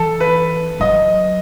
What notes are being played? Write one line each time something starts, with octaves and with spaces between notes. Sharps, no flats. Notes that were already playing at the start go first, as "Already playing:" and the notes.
Already playing: E3 A4
B4
F#3 D#5